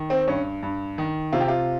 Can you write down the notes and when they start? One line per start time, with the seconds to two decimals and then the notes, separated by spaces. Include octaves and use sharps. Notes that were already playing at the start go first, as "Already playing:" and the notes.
Already playing: D#3
0.10 C4
0.28 G2 C#4
0.63 G2
0.98 D#3
1.32 C3 F4
1.41 G4
1.48 F4